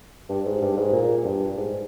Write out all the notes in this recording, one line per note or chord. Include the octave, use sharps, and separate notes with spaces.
G2
G#2
G2
G#2
A#2
G2
G#2